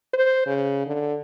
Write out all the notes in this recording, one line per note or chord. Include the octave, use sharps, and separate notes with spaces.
C5
C#3
D3